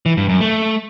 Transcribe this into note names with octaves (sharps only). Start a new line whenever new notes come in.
E3
G2
F#2
A3